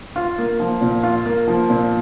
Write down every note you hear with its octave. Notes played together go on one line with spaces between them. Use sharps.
F4
A#3
F3
A#2
F4
A#3
F3
A#2